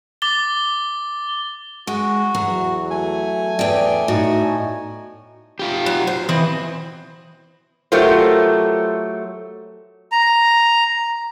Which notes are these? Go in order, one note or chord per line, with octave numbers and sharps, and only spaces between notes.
D6 A6 G7
G#3 F#4
E2 F#3
A3 G#5
E2 D5 G5
A2 D#4 F#4
F4 G4
F#3
C5
E3 C4 E4 D#5
F#3 A3 F4 G4 A#4 C5
A#5